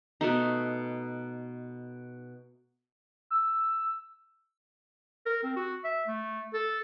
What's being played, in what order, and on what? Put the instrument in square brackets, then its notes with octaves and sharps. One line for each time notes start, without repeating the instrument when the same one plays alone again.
[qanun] B2 A3 D#4
[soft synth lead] E6
[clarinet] A#4
C4
F#4
E5
A3
A4